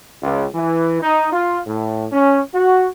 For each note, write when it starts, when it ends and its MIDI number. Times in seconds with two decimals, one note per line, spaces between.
0.23 0.46 37
0.55 1.02 52
1.03 1.32 63
1.33 1.60 65
1.67 2.06 45
2.12 2.40 61
2.55 2.88 66